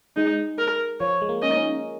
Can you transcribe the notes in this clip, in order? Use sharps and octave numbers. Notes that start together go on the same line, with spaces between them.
G#3 D#4
A#4
F3 C#5
G#3
A#3
C#4 D#5
D#4
C#4